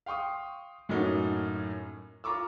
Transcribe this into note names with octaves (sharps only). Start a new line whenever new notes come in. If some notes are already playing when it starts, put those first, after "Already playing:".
F5 G5 C6 C#6 D#6
F#2 A2 A#3 C#4 D#4 F#4
F4 A#5 C#6 D6 E6